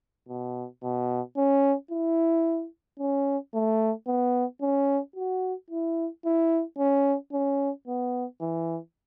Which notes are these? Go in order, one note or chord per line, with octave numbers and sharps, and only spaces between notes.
B2
B2
C#4
E4
C#4
A3
B3
C#4
F#4
E4
E4
C#4
C#4
B3
E3